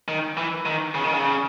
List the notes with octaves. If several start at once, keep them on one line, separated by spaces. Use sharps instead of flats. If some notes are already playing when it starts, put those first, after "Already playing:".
D#3
E3
D#3
C#3
D#3
C#3